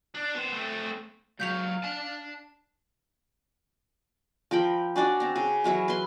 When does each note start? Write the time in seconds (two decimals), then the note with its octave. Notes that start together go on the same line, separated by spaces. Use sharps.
0.15 D4
0.34 B3 C5
0.52 A3 C4
1.40 C#2 F#3 F5 G6 B6 F7
1.84 D4 A5
4.51 F3 A#4 G5 B5
4.96 C#4 D4 F#4 D5
5.20 C4 A#5
5.36 C#3
5.64 E3 F#3 E4 A#4
5.88 B4 C6